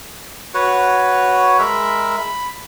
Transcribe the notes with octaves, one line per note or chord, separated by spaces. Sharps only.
F#4 B4 C#5 F#5
G#3 A#4 E5 B5
B5